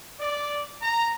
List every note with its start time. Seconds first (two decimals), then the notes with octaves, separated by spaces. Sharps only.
0.19 D5
0.82 A#5